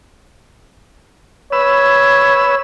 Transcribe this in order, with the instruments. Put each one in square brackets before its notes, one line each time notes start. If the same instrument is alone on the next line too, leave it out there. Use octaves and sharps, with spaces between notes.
[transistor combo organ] B4 E6 [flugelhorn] C#5